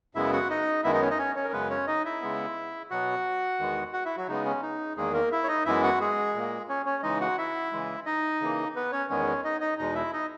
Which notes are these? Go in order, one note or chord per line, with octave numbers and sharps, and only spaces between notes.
F#2 C#3 G#3 B3 E4 E5
F#4 F#5
D#4 D#5
F#2 D#3 G#3 B3 E4 E5
D#4 D#5
C#4 C#5
D#4 D#5
C#4 C#5
C#4 C#5
A#4
F#2 C#3 G#3 B3 B4
C#4 C#5
D#4 D#5
E4 E5
C#3 G#3 B3
B2 F#3 B3 F#4 F#5
E2 D#3 G#3 B3
F#4 F#5
E4 E5
F#3 F#4
C#3 G#3 B3 D#4
C#4
D#4
E2 D#3 G#3 A#3 G#4
A#3 A#4
E4 E5
C#5
D#4 D#5
F#2 E3 G#3 B3 E4 E5
F#4 F#5
G#3 G#4
A#2 A#3
C#4 C#5
C#4 C#5
C#3 E3 G#3 D#4 D#5
F#4 F#5
E4 E5
C#3 E3 G#3
D#4 D#5
C#3 E3 A#3
B3 B4
C#4 C#5
E2 D#3 G#3 B3 C#4 C#5
D#4 D#5
D#4 D#5
E2 B2 G#3 D#4 D#5
E4 E5
D#4 D#5